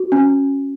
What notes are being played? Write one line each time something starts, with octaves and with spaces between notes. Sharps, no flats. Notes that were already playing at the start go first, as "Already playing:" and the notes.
Already playing: F#4
C#4